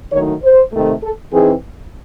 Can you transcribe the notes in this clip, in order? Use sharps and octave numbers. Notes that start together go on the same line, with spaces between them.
D#3 F#3 A3 D#4 C#5
C5
C3 D#3 A3
A4
E3 C4 D#4 G#4